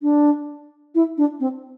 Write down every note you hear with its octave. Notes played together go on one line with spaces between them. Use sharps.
D4
E4
D4
C4